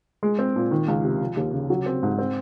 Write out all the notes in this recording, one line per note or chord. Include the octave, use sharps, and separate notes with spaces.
G#3
C4
A#2
D#3
C#2
C3
F3
D#2
C#3
F#3
C4
G#2
C4